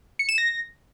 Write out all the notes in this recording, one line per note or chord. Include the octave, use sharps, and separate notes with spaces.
C#7
E7
A#6